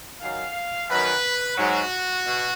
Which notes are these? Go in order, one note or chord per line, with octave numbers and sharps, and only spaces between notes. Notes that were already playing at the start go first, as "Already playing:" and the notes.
F#2 D#3 F#3 F5
F#2 D#3 F#3 B4
G#2 F#3 F#4
B2